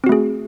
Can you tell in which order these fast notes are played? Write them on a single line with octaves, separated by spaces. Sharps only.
C4 F#4 A3 G#4